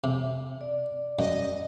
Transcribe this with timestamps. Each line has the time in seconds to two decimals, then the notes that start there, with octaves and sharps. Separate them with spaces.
0.04 C3
0.61 D5
1.19 F#2 D#5